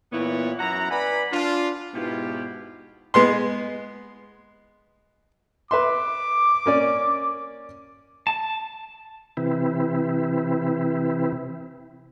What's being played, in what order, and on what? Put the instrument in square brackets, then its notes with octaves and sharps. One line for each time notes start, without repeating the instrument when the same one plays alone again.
[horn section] A#2 E3 B3 E4 C#5 F#5
F#2 E4 F#5 A#5
B4 D5 F#5 G#5 B5
D4 F4
G#2 B2 B3 E4 F4 G4
[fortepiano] G#3 B3 C6
[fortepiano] B4 E5 C6 [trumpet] D6
[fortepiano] A#3 C#4 D5
[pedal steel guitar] A5
[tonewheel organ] C3 E3 C4 E4